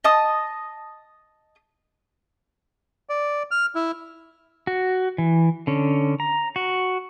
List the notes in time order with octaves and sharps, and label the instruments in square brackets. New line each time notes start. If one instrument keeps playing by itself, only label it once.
[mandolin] D#5 A5 D#6
[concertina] D5
F6
E4
[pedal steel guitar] F#4
E3
D3 C#4
A#5
F#4